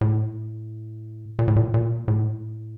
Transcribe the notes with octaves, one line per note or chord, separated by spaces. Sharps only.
A2
A#2
A2
A#2
A#2
A2